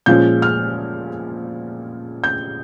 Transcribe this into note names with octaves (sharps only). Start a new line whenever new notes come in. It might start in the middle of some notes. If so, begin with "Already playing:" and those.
A#2 F3 G#3 C#4 G6
F6
G6